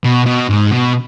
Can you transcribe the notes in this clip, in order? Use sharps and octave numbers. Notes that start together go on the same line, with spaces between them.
B2
B2
G#2
B2